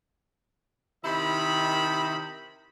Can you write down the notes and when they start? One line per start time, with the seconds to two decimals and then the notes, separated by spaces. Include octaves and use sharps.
1.05 C3 D#3 E4 D#5 B5